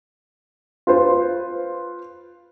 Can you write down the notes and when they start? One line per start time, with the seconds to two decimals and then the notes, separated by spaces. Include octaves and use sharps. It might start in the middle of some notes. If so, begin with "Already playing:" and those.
0.87 F4 B4 C5